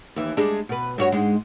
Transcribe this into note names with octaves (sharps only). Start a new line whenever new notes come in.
D#2 E3
G3 G#3 D4
B2 B4
G2 F#4 C#5
G#2 G#3